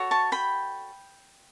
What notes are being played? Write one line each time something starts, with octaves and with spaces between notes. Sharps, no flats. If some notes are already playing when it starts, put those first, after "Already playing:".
Already playing: F#4 A4 C#5
A5 C#6
G5 B5